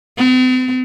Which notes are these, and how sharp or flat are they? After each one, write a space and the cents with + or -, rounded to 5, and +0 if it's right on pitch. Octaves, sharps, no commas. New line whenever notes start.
C4 -45